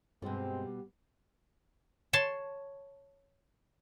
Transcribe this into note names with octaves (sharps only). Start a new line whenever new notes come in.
G2 B2 G3 G#3 C4 G4
C#5 A5 C6